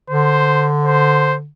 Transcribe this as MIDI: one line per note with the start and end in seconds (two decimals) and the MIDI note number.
0.10 1.48 50
0.10 0.69 72
0.84 1.35 72